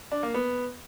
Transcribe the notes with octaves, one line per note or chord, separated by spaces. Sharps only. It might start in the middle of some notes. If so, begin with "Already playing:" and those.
D4
A#3
B3